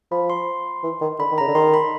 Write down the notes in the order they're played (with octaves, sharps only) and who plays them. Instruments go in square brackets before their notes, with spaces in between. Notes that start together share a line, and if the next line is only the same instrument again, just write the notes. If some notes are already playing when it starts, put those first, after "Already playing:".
[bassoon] F3 [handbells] B5
[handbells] C6
[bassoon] E3
D#3
[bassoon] D3 [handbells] B5
[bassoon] D#3
[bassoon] C#3 [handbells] A#5
[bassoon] D3
[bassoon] D#3 [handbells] C6
[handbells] B5